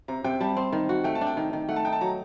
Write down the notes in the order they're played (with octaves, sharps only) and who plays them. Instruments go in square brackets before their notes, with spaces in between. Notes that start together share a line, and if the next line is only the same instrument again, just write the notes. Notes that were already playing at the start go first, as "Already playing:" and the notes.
[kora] C3 [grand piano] A#5
[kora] C3 [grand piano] G5
[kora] G3 [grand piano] A5
[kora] C4
D#3
F#4
[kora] A3 [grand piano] G5
[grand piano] A5
[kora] D4
[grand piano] G5
[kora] D#3
D#3
[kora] A3 [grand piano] F#5
[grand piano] A5
[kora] D#4 [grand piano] G5
[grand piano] A5
[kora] F#3 [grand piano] A#5